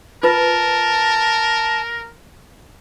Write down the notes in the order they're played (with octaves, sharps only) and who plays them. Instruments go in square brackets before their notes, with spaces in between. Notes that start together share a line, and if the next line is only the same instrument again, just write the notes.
[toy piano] F4 B4 [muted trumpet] A#4 [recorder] A5